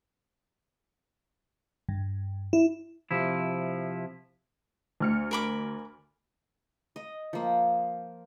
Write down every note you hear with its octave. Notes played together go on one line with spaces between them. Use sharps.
G2
E4
C3 F3 E4
D2 F6 C#7
A#4 B5 D6
D#5
F3 A#3